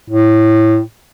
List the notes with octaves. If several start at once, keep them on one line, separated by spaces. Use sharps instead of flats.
A2